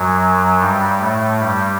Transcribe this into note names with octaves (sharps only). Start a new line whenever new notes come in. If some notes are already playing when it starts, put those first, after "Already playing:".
Already playing: F#2 F#3
G2 G3
A2 A3
G2 G3